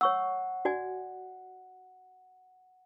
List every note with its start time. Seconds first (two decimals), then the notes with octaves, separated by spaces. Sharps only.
0.01 C#5 F#5 C#6 E6
0.65 F#4 D5 G#5